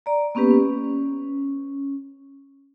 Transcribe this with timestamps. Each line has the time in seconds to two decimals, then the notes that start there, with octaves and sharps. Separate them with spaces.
0.06 D5 A#5
0.35 A#3 B3 C#4 G4 B4
0.51 C#4